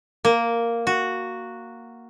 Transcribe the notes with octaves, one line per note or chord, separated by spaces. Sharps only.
A#3
F#4